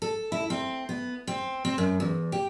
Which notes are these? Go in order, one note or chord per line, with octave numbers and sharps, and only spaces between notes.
A4
E4
C4
B3
C4
C4
F#2
E2
G4